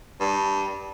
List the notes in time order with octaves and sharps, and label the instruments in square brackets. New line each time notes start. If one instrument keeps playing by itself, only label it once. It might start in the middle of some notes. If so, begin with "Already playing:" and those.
[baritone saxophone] G2